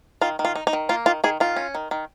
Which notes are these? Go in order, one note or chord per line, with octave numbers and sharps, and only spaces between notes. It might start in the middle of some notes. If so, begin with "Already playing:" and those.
D#3 F4
D#3
F4
D#4
D#4
D#3
A#3 F4
D#3 F4
D#3 G#4
D#3 F4
C#4
D#3
D#3